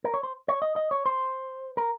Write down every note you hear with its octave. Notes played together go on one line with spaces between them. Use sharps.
A#4
C#5
C5
C#5
D#5
D#5
C#5
C5
A#4